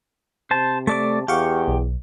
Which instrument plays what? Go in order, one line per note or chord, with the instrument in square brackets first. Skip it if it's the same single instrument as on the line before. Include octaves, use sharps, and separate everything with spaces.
[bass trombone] C3 [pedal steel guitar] C5 A5
[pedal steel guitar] A3 D5 D6 [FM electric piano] A5
[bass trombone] E2 [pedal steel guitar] G4 [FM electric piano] F5 F#5 C#6
[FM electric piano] B1